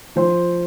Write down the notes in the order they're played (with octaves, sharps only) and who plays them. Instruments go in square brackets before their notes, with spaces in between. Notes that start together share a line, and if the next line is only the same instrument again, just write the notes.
[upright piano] F3 C5